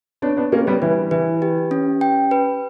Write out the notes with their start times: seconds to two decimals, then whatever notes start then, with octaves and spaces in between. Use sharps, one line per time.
0.22 B3 D4 C#5
0.37 B3 D4
0.52 A#3 C#4 G4
0.67 G3 B3
0.82 E3 B4
1.11 E3 B4
1.42 G4
1.71 C#4
2.01 G5
2.31 B4